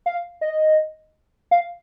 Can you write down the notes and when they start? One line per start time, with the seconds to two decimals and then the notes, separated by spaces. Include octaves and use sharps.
0.06 F5
0.41 D#5
1.51 F5